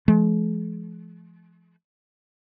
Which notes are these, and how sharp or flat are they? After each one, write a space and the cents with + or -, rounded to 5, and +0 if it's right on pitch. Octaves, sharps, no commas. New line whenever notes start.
F3 -30 G#3 +45